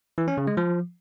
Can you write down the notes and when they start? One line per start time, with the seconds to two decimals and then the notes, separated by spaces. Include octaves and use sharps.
0.18 E3
0.28 C#4
0.38 C#3
0.47 G#3
0.57 F3